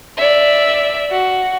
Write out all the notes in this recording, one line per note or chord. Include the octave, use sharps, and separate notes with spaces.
D5 E5
F#4